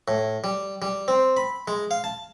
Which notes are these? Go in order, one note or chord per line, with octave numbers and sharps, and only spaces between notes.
A2
G3
G3
C4
B5
G#3
F5
A5